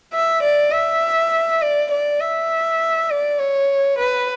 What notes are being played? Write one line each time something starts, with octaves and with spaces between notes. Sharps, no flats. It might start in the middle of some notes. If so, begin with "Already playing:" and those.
E5
D5
E5
D5
D5
E5
D5
C#5
B4